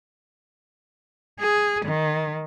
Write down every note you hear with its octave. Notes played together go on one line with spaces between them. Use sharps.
G#4
D#3